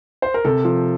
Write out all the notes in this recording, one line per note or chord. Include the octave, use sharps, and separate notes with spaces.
C5
A#4
C3 A4
F3